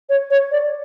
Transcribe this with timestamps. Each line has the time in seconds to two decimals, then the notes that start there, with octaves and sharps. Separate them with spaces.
0.09 C#5
0.30 C#5
0.51 D5